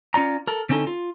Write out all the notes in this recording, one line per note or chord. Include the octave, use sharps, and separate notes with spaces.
C#4 F4 D5 A#5
A4 A#4
D3 C4 C#4 D#4 A4
F4